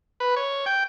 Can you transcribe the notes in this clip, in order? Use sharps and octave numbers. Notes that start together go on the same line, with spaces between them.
B4
C#5
G5